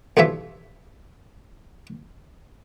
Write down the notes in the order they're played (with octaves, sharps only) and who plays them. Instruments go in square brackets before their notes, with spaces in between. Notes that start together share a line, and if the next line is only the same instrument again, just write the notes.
[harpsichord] B1 G2 E3 F3 E5